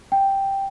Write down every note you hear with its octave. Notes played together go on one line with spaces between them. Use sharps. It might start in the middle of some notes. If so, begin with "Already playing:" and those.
G5